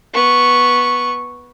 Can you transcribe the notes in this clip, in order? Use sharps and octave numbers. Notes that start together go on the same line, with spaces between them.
B3 C#6